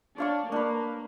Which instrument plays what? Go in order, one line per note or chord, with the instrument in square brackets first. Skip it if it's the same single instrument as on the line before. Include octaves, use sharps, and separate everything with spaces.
[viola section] D4 [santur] C#5 F5 C#6
[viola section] A#3 [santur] D4 B4